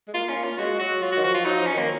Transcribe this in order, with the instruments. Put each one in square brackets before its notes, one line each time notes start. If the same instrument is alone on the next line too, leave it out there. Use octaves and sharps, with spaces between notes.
[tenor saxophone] G#3
[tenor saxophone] A#3 [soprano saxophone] F4
[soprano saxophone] C#4
[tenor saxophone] A#3
[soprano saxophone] F4
[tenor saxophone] G#3 [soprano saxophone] F#4
[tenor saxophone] F#3 [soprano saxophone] F#4
[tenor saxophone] F#3 [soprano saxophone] F4
[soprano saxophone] F#4
[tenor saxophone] D#3
[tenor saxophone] F3 [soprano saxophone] F#4
[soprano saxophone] F4
[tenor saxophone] F#3 [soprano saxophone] D#4
[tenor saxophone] F3
[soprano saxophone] C#4
[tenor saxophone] D#3 [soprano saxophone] A#3